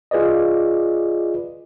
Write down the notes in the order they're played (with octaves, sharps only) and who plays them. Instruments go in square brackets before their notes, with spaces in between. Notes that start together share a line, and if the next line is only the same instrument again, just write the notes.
[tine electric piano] F4 G#4 B4 D5 D#5